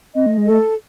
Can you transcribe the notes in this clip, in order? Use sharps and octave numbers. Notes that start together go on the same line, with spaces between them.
C4 D#5
A3
G#3
A3 A4